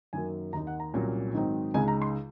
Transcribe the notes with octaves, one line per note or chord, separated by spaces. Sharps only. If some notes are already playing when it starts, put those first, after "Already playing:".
F#2 D#3 F#3 A#3 G#5
D#2 D#3 A#3 D#4 A#5
F#5
A#5
C2 A#2 F#3 C#4
G#2 D#3 F#3 C4 D#4
C#2 C#3 G#3 D#4 G#5
A#5
C6